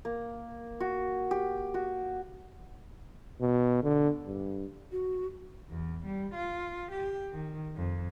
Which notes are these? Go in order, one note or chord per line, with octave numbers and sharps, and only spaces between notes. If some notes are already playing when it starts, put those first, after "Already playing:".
A#3
F#4
G4
F#4
B2
D3
G2
F#4
E2
G3
F4
G4
D#3
F2